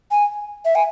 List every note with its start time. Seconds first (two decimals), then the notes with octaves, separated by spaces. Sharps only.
0.11 G#5
0.65 E5
0.75 G#5